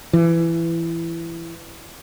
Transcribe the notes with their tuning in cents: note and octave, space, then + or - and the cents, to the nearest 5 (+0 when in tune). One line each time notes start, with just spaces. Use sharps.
E3 +15